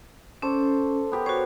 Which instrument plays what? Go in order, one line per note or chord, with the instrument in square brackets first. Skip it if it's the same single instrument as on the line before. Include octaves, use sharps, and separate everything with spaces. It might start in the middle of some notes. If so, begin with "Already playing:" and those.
[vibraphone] C#4 [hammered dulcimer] A4 C5 D5
[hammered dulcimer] B3 G4 A#4
[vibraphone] F#4 C5 [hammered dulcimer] C#5